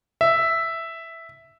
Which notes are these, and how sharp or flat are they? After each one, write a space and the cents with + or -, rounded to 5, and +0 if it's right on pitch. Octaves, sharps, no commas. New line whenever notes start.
E5 +0